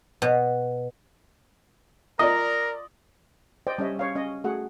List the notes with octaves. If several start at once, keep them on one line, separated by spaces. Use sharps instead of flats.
B2
F4 A#4 D5 D#5 A#5
C5 D5 D#5 G5
G3 C#4 C#5 D#5 E5
C#4 C#5 F5
C#4 D#5
A3 F#4 G#4 F#5